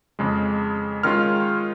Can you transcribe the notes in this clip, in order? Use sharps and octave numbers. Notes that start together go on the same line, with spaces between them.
F2 C#3 G#3
D#3 G#3 C#4 F4 F6